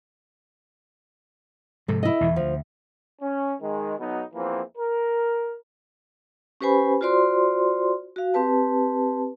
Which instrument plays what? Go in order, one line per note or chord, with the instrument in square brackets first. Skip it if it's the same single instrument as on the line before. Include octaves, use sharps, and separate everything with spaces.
[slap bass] G#2 C3 F3 [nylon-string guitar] A4
[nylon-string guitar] E4 D#5
[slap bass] E2 B2 E3
[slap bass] D2 [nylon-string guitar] F3
[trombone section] C#4
D#3 G#3
B1 B2 F#3 B3 D#4
E2 E3 F3 A#3 C4
A#4
[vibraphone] C#4 G4 B4 C5 G#5 B5
F4 F#4 C5 D5 C6
F#4 F5
C4 G4 B4 A5